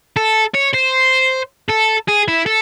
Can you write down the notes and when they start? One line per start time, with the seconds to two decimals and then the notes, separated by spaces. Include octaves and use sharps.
0.16 A4
0.54 C#5
0.73 C5
1.70 A4
2.08 G#4
2.28 E4
2.46 A4